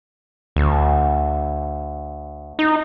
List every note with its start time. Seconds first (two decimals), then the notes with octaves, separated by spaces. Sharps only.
0.56 D2
2.59 D#4